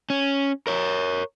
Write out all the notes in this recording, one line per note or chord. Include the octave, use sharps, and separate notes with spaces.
C#4
A#4 C#5